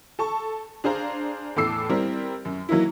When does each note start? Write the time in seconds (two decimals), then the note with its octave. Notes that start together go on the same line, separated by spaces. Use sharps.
0.19 A4 A5 C#6
0.84 D4 G#4 C5 F5 A#5
1.56 E2 A2 A4 D6 E6 C7
1.89 G3 C4 E4 A#4
2.45 F#2
2.69 E3 F#3 A#3 D#4 E4